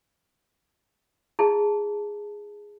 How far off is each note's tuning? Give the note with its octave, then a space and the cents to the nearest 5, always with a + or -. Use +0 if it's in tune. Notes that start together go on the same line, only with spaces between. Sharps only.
E4 +0 G#4 -5 A5 +0